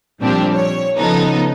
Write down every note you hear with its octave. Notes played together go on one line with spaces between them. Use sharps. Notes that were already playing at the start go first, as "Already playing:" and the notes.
A#2 F3 G3 C4 D4 G4
C#5
C#3 F3 B3 D#4 A4